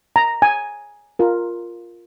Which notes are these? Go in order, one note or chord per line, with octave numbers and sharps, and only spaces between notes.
A#5
G#5
F4 A#4